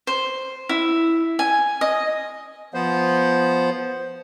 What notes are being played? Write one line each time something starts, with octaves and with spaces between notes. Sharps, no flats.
C5
E4
G#5
D#5
F3 B3 C5